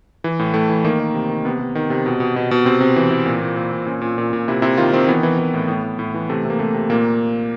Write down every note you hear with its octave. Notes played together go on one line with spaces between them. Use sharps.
E3
A2
A2 A3
E3
D#3 A#3
D#3
C3
D#3
C3 B3
C3
D#3
C3
B2
B2
B2
B2
C3 C4
C3
E3
E3
A#2
A#2
A#2
A#2
A#2 C#4
A#2
A#2
A#2
C3 E4
C3 E4
D#3 F4
D#3 C4
E3 B3
E3
E3
A2
A2
A2
A2
E3
C3 A3
C3
A#3
C3 A3
C3
A#2 A#3